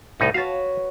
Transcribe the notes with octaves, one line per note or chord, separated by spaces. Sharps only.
C2 A2 D#4
F#4 B4 C#5 F5 A5